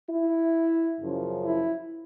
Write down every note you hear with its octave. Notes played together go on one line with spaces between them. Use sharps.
E4
F#2 C#3 F3
E4